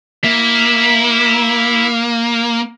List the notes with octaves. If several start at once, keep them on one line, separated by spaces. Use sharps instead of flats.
A#3 E4 E5